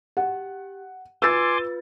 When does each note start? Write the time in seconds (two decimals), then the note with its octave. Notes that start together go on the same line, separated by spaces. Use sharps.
0.17 G4 F#5
1.22 F4 B4 G#5 C6 D6 E6 A6